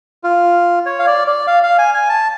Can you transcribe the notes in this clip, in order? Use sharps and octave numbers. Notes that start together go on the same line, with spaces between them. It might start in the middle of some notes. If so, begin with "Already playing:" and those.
F4
C#5
F5
D5
D5
F5
F5
G#5
G#5
A5